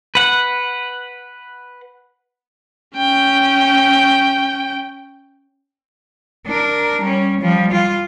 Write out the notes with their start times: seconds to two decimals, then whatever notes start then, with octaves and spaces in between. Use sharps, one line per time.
0.15 B4 F#5
2.96 C#4 G5
6.47 D4 A#4
7.01 G3 C#4
7.41 F3 G3
7.71 G3 F4